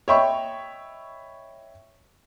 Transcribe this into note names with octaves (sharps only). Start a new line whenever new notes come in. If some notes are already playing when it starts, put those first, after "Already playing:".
C#5 D#5 E5 G5 B5 C#6